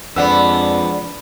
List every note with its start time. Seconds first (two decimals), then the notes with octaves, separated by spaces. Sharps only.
0.16 F2 F3 G#3 B3 D4 D5 F#5 E6